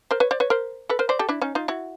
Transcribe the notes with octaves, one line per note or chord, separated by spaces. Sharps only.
A#4 C5
B4 C#5
C5 D5
B4 C#5
A#4 C5
A4 B4
A#4 C5
C5 D5
G4 A4
D4 E4
C#4 D#4
D#4 F4
E4 F#4